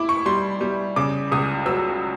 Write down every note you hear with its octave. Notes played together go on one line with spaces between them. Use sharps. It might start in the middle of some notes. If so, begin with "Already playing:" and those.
Already playing: E4 D6
C#6
G3 C6
G3
C#3 D6
C#2 D#6
F#3 E6